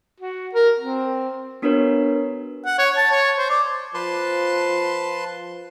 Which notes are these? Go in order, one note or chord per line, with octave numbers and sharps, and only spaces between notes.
F#4
A#4
C4
B3 D4 F#4 A#4 B4 C#5
F#5
C#5
A5
C#5
C5
D5
F3 B4 A5 C6